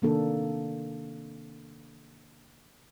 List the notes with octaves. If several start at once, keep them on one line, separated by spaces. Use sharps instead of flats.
C3 D#3 A#3 D4 A4